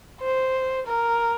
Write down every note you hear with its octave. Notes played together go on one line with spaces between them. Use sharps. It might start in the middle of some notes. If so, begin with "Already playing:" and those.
C5
A#4